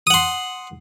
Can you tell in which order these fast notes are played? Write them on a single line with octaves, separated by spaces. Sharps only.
D#6 F#5 C6